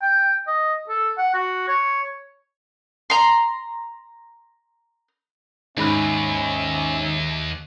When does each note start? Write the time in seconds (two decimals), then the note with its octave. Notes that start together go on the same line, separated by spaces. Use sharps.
0.02 G5
0.47 D#5
0.89 A4
1.18 F#5
1.34 F#4
1.68 C#5
3.10 A#5 C6
5.77 D#2 G#2 C#4 E5 B5 F#6